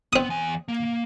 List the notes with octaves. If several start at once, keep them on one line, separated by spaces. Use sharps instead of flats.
B3 C4 D#6
E2 G#5
A#3